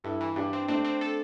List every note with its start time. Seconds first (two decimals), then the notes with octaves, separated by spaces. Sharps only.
0.04 G2 E4 A4
0.20 E3
0.36 G2 D4 G4
0.53 C4
0.68 A3 C4 D4
0.85 C4
1.01 A4